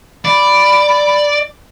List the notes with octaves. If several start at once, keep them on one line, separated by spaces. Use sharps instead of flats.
D5 B5